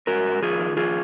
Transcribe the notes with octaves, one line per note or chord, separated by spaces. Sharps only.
G#2 F#4 A#4
G#2
F2 F4 G#4
D#3
F2 F4 G#4